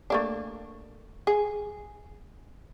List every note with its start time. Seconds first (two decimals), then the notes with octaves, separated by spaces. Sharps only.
0.10 A3 A#3 D4
1.27 G#4